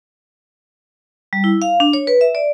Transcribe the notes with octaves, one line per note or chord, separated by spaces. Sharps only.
G3
E4
F5
D4
C#5
B4
E5
D5